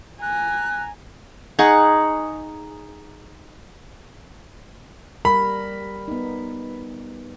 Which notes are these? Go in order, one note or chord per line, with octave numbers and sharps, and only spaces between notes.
G#5 A#5 F#6
D#4 G#4 F#5 C#6
G3 A#4 B5
B3 D#4